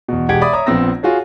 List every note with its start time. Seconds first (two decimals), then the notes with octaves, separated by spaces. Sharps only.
0.08 E2 B2
0.29 E1 G#3 G4 F#5 G#6 D7
0.41 D5 E5 B5 D6 D#6
0.53 C#5 E5 A#5 D#6
0.66 A#1 F3 B3 C4 E6 A#6
1.03 F4 F#4 G#4 C#5